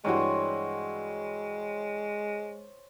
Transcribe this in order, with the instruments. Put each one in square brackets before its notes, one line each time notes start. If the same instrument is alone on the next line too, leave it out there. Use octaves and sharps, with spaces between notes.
[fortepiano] G2 E3 F#4 [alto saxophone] G#3 [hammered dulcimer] C5 C#5